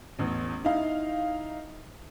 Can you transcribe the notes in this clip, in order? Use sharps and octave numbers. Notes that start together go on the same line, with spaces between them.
A1 E2
D#4 E4 F5